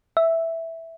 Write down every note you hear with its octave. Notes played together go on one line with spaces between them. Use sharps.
E5